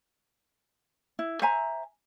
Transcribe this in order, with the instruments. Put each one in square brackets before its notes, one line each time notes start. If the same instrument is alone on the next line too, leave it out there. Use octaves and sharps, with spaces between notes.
[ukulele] E4
C5 E5 G#5 A#5